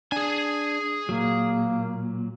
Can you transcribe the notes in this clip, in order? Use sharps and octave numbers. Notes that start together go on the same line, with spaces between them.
D4 G#4 G#5
A#2 F#3 A#3